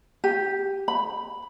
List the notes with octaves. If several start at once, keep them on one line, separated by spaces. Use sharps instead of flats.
G4
B5